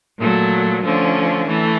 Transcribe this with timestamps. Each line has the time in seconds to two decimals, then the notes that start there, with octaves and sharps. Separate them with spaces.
0.19 A#2 F#3 A3
0.83 D3 F3 A3 C#4
1.47 E3 A3